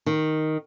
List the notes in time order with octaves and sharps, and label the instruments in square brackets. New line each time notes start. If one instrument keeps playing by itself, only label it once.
[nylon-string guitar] D#3